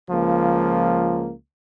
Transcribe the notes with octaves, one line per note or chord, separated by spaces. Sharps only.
C#2 F3 A#3